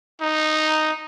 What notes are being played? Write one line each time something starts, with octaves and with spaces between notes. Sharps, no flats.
D#4